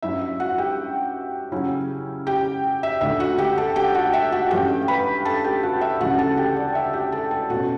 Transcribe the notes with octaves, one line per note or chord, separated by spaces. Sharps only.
G2 F#3 C#4 E4 E5
E5
F#4 F#5
G4 G5
C#3 F#3 C#4 E4
G4 G5
E5
D2 D3 A3 E5
F#4 F#5
G4 G5
A4 A5
G4 G5
F#4 F#5
E5
F#4 F#5
G2 E3 A3 C#4 G4 G5
B4 B5
A4 A5
G4 G5
F#4 F#5
E5
D2 C#3 E3 G3 C#4 F#4 F#5
A4 A5
G4 G5
D5
E5
G4 G5
A4 A5
A4 A5
B2 A3 C#4 F#4 F#5